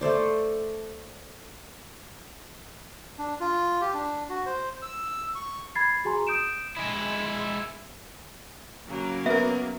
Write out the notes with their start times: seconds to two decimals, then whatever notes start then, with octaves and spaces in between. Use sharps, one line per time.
0.01 A3 A4 C5 D5
3.19 D4
3.40 F4
3.81 G4
3.94 D4
4.29 F#4
4.46 C5
4.82 E6
5.35 C#6
5.75 B5 G#6 A6 C7
6.05 F#4 G#4 G#5 A#5 C6
6.27 D#6 G6 D7 E7
6.77 G#3 E4
8.86 C#3 F#3 A#3
9.26 B3 A#4 E5